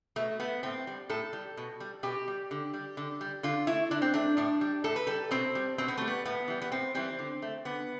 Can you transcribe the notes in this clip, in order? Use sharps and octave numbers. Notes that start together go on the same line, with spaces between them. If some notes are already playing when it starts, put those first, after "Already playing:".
B2 A3
A3 B3
A2 C4
G3
A2 A4
G3
B2
G3
B2 G4
G3
D3
G3
D3
G3
D3 F4
A3 E4
D3 D4
C4
A3 D4
A2 D4
G3
A2 A4
B4
G3 A4
B2 C4
G3
B2 C4
B3
G3 A3
B3
A2 B3
E3 G3
B3
A2 C4
E3 G3 C4
D3
A3
D3 B3